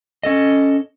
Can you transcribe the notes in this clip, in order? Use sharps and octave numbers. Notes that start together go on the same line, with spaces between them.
C#4 A4 D#5